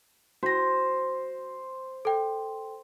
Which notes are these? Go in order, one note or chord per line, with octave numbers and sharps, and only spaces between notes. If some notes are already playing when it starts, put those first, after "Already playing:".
F#4 C5 A#6
A4 G5